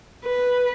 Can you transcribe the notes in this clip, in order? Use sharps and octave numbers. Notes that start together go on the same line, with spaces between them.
B4